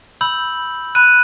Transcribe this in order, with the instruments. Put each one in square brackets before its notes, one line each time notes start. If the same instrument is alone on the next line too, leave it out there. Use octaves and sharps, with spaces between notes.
[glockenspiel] B5 E6 G6 F#7
B5 F#6 D#7